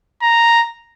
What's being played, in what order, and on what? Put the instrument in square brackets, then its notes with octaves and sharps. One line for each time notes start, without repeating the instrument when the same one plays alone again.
[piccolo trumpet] A#5